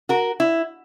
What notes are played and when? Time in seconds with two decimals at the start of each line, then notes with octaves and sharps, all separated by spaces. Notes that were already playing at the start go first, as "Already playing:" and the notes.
0.09 F#4 A#4
0.40 E4